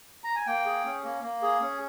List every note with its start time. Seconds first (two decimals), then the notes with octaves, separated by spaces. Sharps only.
0.24 A#5
0.35 G#5
0.46 A#3 G5
0.66 G#4
0.85 C#4
1.04 A#3
1.22 A#3
1.42 G#4
1.61 C#4